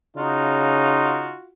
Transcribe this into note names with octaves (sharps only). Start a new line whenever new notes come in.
C#3 D#4 F4 F#4